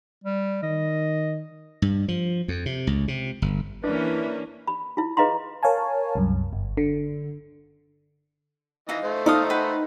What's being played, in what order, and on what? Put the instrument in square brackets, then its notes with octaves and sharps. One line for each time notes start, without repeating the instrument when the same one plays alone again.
[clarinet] G3
[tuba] D#3 [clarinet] D#5
[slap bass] G2
F3
F2
C3
C#2
C3
G1
[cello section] E3 [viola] A#3 C#4 [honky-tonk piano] D4 [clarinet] B4
[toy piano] B5
E4 F4
G#4 B4 D#5 F5 A#5 C6
[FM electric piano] A#4 C#5 F5 G#5 A5
C2 F#2
G1
D3
[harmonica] E3 D#5 [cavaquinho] D#4 F4
[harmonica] A3 C5
[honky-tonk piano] D#4 [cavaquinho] A4 F5 D#6
[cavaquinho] B4 F#5 G5